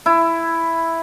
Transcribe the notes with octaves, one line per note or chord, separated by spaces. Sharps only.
E4